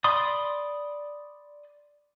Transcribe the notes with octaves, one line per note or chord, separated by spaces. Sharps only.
D5 B5 C6 D#6